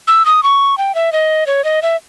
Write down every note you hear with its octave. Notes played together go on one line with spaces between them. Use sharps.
E6
D#6
C#6
G5
E5
D#5
C#5
D#5
E5